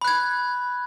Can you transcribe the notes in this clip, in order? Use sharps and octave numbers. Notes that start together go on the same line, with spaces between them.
B5 F#6 G#6